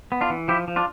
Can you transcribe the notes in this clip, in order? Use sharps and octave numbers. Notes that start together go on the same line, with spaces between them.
B3
D4 F4
E3
F3 E4 G4
F3
D4 F4